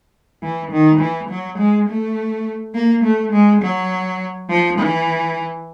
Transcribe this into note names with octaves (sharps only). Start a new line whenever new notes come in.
E3
D#3
E3
F#3
G#3
A3
A#3
A3
G#3
F#3
F3
E3